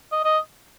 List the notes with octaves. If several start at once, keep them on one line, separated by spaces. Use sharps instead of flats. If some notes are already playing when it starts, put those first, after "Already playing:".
D#5
D#5